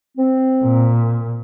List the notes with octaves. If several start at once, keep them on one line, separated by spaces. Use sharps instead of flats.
C4
A#2